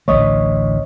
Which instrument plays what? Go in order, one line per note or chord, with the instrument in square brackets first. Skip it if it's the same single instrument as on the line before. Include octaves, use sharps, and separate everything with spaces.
[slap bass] A1 D2 A3 [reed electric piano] C#5 D#5